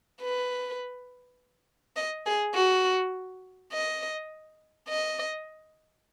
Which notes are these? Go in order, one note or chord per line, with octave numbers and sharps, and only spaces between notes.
B4
D#5
G#4
F#4
D#5
D#5